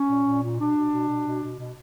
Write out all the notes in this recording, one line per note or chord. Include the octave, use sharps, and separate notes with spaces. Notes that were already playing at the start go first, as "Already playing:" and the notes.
Already playing: C#4
A#2
A#2
A#2
B2 D4
B2
B2
B2
B2
B2
B2